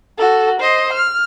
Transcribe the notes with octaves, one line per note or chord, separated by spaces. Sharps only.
F#4 A4
C5 D#5
F6